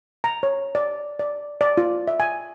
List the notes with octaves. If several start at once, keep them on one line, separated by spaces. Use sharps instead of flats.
A#5
C#5
D5
D5
D5
F4
E5
G#5